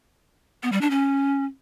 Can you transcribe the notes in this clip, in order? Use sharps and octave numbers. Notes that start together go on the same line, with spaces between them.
B3
G3
D4
C#4